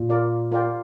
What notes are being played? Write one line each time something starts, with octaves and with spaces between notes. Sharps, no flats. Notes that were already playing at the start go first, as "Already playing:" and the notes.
Already playing: A#2
F4 A#4 D5
F4 A#4 D5 G5